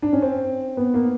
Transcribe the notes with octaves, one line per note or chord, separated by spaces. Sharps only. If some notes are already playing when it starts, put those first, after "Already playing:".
D4
C#4
C4
B3
A#3